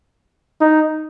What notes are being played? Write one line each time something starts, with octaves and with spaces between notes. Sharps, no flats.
D#4